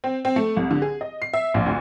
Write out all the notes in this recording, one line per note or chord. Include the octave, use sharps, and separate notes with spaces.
C4
C4
A3
C2
D3
G#4
D#5
C7
E5
A#1
D2